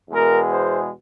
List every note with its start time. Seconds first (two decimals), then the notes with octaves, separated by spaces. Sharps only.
0.10 E2 B2 G#3 A#4
0.51 C5